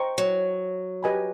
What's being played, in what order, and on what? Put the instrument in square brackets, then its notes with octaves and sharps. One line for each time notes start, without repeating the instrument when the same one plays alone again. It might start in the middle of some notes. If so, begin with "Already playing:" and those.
Already playing: [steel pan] C5 D#5 G5 A#5 C#6
[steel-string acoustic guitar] F#3
[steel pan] G4 B4 D#5 G#5 B5